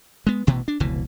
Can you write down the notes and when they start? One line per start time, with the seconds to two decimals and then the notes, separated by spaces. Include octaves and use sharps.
0.27 G#3 B3
0.47 A1 B2 E3 B3
0.68 D4
0.80 F1 C#2 B2 E3